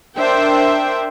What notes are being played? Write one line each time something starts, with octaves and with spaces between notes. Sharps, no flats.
D4 A#4 C5 E5 G5